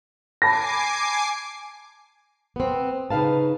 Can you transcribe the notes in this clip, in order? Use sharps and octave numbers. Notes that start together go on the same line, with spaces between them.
G#5 A5 B5 D6 A#6 C7
B3 C4
C#3 D#4 B4 F5 A5